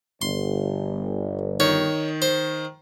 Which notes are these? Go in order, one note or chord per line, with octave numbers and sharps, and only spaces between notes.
G1 C6
D#3 C#5
C5